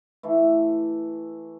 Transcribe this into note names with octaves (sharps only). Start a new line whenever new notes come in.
E3 A3 E4